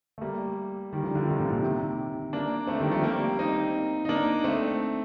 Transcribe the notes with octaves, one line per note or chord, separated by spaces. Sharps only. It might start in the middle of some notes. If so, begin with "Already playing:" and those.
A3
G3 A#3
D#3 G3
D3 F3
D3 F3
C3 D#3
A#2 D3
A#2 D3
C3 D#3
A#3 D4
A3 C4
D#3 G3
F3 A3
G3 A#3
C4 D#4
D#4
A#3 D4
A3 C4